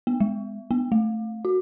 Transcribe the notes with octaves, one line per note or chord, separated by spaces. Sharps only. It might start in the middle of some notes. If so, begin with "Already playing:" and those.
B3
G#3
B3
A3
F#4